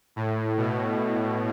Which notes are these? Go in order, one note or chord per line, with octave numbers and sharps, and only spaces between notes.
A2
B2